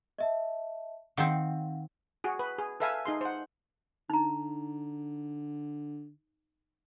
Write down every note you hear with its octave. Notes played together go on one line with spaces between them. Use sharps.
D#5 E5 A5
D#3 C4 F5 F#5
F#4 G#4
B4
G#4
A4 B4 E5 F5 G#5
D#4 G#4 C6
C5 F#5
D3 D#4 A#5